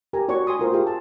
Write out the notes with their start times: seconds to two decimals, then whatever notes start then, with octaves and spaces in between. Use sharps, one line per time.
0.13 G4 A#4 G#5 A#5
0.29 F#4 C#5 D5 C#6
0.47 G#5 C6 D#6
0.59 F4 A#4 C5
0.72 F4 G4 G#4 F5
0.87 A5